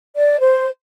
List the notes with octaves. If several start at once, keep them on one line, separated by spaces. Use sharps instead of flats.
D5
C5